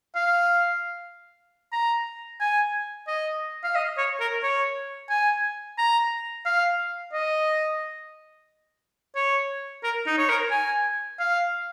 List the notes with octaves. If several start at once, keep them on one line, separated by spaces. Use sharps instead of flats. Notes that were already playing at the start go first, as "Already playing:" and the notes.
F5
A#5
G#5
D#5
F5
D#5
C#5
A#4
C#5
G#5
A#5
F5
D#5
C#5
A#4
D#4
C#5
A#4
G#5
F5